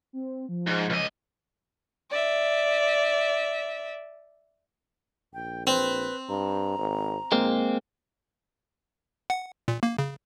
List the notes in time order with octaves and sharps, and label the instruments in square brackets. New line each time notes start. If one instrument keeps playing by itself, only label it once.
[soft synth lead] C4
F3
[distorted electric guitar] G#2
C#2 D#5
[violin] D5 E5
[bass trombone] A#1 [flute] G5
[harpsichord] C4 [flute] B4
[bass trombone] G2 [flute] A#5
[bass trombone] G#1
[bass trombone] A#1 [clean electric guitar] G#3 A#3 C4
[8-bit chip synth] F#5
A#2
A#3
C#3